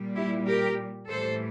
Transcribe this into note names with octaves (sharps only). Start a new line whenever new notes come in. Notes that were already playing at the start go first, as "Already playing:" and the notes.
Already playing: A#2 G3
E4 G4
G4 A#4
A2 E3 G3 A4 C5